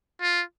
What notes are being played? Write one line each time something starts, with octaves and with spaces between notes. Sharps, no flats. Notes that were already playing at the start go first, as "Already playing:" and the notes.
F4